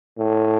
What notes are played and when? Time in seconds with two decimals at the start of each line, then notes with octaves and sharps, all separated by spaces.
0.18 A2